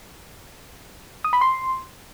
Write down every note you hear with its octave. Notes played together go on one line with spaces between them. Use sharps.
D#6
B5
C6